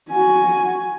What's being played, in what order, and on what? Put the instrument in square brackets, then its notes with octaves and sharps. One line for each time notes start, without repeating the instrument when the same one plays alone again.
[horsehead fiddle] F#4 G#5